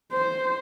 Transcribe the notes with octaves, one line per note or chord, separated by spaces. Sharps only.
C5